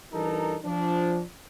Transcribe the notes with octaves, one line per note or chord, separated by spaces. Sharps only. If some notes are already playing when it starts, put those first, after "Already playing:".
G2 E3 D#4 A4 A#4 A#5
F3 D4